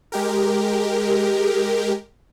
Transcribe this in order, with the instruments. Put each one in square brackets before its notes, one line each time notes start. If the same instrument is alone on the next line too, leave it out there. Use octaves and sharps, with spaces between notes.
[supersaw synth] G#3 G4 A#4